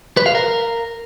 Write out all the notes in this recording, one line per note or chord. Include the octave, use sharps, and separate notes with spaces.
B4
F5
A#4